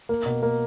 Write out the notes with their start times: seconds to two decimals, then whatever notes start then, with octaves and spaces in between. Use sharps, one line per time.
0.09 A#3
0.26 B2
0.43 A#3